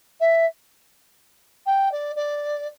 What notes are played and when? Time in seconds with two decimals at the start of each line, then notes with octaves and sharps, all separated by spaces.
0.20 E5
1.66 G5
1.91 D5
2.15 D5